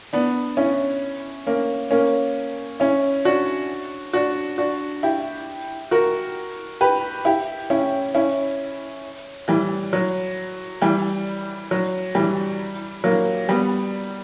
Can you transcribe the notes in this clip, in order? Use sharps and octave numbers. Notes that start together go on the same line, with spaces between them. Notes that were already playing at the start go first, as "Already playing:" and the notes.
B3 D4
C#4 E4
A#3 C#4
A#3 C#4
C#4 E4
D4 F#4
D4 F#4
D4 F#4
E4 G4
F#4 A#4
G4 B4
E4 G4
C#4 E4
C#4 E4
E3 G3
F#3
E3 G3
F#3
E3 G3
F#3 A#3
G3 B3